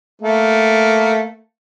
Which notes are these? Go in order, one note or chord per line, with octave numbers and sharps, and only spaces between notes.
A3 A#3